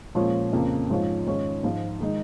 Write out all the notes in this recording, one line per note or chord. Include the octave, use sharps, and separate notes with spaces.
A#2 F3 G#3 C#4 F4
F2 C#3 A#3
G#2 F3 C#4 F4
G#2 D#3 C#4 F4
G#2 F3 G#3 F4
D#3 G#3 D#4